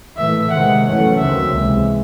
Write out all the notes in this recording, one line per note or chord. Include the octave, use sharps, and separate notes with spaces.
A2 E3 A3 E5
C3 D#3 G#3 C4 F#5
F#2 E3 A3 C#4 F#5
D#2 C#3 F#3 C4 E5
C#2 C3 E3 G#3